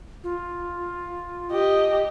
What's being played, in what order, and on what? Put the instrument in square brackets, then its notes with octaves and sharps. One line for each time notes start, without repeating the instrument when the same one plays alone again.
[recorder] F4
[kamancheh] G4 D#5